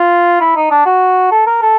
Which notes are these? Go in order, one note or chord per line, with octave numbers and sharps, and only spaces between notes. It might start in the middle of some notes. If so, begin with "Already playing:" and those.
Already playing: F4
E4
D#4
D4
F#4
A4
A#4
A4